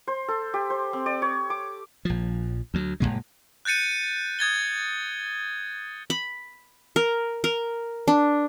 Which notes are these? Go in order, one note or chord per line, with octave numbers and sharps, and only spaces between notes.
C5
A4
G4
C5
C4
D5
C#5
D6
A#1 F3
D2 F#3
F#1 D#2 A#2 G#3
F#6 G6 A6 C#7 D#7
D#6 G#6 A6 G7
B5
A#4
A#4
D4